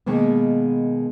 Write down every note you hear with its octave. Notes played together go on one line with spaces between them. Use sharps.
B2 D#3 G#3 A#3 B3